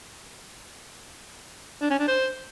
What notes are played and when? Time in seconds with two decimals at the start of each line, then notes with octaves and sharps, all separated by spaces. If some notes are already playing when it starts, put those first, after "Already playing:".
1.82 D4
1.91 C#4
1.99 D4
2.08 C5